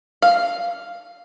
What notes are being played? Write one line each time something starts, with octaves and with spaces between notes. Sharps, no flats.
F5